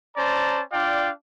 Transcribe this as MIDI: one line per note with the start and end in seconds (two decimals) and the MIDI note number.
0.17 0.62 61
0.17 0.62 72
0.17 0.62 74
0.17 0.62 81
0.17 0.62 82
0.73 1.11 62
0.73 1.11 65
0.73 1.11 74
0.73 1.11 77
0.73 1.11 79